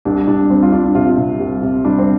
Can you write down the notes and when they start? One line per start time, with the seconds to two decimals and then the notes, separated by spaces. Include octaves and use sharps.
0.05 C2 D4
0.27 C2 D4
0.50 G3 C4
0.63 F4
0.72 G3 D4
0.85 D4
0.95 C3 F4
1.18 C3
1.40 C2
1.62 C3
1.85 G3 D4
1.98 C4